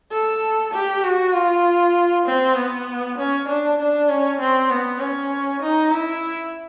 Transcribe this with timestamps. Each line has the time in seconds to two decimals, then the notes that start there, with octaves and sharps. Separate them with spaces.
0.12 A4
0.73 G4
1.04 F#4
1.34 F4
2.26 C4
2.57 B3
3.18 C#4
3.48 D4
3.79 D4
4.09 C#4
4.40 C4
4.70 B3
5.00 C#4
5.62 D#4
5.92 E4